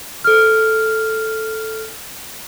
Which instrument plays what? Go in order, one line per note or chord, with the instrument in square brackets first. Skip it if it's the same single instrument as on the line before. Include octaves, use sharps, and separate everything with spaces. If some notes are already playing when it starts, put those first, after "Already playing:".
[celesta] A4 F6